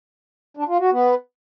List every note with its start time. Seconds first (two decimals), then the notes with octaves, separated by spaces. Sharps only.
0.57 D4
0.69 F4
0.80 F#4
0.92 B3